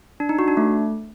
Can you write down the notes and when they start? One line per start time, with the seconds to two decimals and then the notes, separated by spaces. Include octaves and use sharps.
0.20 D4
0.29 D#4
0.39 F#4
0.48 D4
0.57 A3